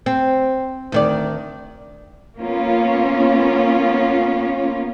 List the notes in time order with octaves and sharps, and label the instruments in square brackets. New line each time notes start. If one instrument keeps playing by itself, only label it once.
[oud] C4
D2 D#3 D5
[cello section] A#3 B3 C#4 F4